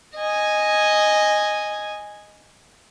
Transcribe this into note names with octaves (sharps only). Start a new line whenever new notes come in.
D#5 G#5